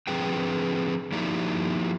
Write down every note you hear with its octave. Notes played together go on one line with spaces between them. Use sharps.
D3 F3 C4 G#4 B4 G5
F3 A#3 D#4 E4 G4 D5